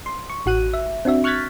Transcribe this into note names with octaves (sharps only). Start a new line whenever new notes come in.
C6
C#6
A1 F#4 F#6 D#7
E5
C4 D4 F#4 E5
C#6 F6 F#6 G#6 A6 B6